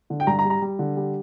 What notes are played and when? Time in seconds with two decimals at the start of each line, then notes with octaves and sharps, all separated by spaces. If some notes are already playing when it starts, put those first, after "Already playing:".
0.10 D3
0.20 G5
0.27 G2 A#5
0.39 A#5
0.45 G3
0.50 A#5
0.62 G3
0.79 D3
0.97 G3